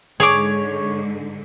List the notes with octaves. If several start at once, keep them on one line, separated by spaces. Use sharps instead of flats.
G#2 D3 G#4 C#5 D6